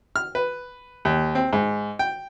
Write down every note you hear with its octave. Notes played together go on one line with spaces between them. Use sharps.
F6
B4
D#2
C4
G#2
G5